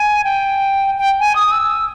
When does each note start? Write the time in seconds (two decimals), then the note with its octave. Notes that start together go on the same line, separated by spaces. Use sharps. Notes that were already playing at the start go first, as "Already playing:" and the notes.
Already playing: G#5
0.24 G5
0.98 G5
1.20 G#5
1.36 D#6
1.52 E6